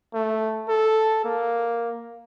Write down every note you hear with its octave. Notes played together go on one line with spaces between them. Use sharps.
A3
A4
A#3